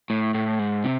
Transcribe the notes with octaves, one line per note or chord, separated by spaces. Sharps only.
A2
A2
G#2
C3